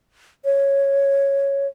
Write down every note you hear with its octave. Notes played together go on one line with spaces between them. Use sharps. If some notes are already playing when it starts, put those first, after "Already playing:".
C#5